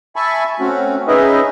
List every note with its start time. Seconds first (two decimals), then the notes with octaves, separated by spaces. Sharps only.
0.16 E5 G#5 A5 B5 C#6
0.60 A3 C4 C#4 F#4
1.08 C#4 D#4 G#4 B4 D#5 E5